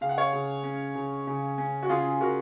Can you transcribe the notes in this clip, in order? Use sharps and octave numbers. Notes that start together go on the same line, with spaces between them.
C#3 F5
F#5
C#5 F5
C#3
C#4
C#3
C#3
C#4
F#4
C#3 F4 G#4
C#3 F#4 A#4